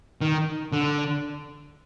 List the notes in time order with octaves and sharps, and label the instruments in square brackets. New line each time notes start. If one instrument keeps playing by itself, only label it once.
[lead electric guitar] D#3
D3